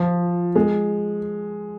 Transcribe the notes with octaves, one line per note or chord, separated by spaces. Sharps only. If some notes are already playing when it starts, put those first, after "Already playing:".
Already playing: F3
G#3